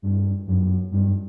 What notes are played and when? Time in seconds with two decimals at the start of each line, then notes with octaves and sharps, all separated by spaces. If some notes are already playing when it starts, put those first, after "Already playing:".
0.02 G2
0.47 F#2
0.91 G2